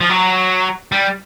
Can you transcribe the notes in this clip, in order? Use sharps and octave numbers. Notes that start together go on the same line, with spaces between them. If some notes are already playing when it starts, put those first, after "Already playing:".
F3
F#3
G3